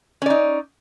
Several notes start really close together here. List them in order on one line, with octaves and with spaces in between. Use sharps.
C#4 D5 D#4